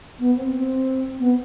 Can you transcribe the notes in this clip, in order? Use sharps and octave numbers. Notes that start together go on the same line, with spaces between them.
B3
C4
C4
B3